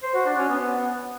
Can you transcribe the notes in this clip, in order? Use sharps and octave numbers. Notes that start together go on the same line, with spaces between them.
C5
F#4
D4
C#4
B3